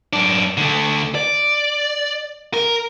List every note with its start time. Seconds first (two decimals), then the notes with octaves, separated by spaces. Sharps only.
0.13 F#2 D4
0.57 D3 A3
1.15 D5
2.54 A#4